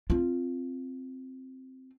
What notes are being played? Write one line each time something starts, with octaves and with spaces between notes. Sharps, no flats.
C4 F4